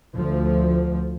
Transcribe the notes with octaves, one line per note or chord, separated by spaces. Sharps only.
D2 F3